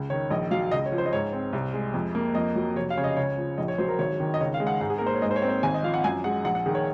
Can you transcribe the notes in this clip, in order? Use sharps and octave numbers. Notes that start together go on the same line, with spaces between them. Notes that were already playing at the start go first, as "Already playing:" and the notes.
Already playing: C#2
D#3 C#5
A#1 D#5
F#3 F5
C#2 D#5
C#5
F3
C5
D#5
G#2 C#5
C4
C2
G#3
F2
A#3
F2 D#5
F#3
F1 C#5
F5
C#3 C#5
D#5
C#2 C#5
F3
A#1 D#5
C#5
F#3 C5
A#4
G#1 C#5
D#3
D#5
C#2 C#5
F5
G#3
F#5
G#2 F#5
G#4
A#3 A#4
C5
C#5
G#2 D#5
C5
C#5
C4
C5
G#1 G#5
D#5
F3 F5
F#5
F#2 G#5
G#3 F#5
A#1 F#5
F#5
D#3 G#4
C#5